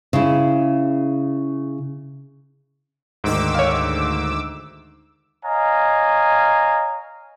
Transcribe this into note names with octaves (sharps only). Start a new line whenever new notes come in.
C#3 E4
D2 G#2 D#3 D6 E6
C#5 F5
C#5 D#5 F5 G#5 A#5